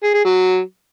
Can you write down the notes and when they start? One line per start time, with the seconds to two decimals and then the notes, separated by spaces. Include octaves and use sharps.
0.03 G#4
0.14 G#4
0.25 F#3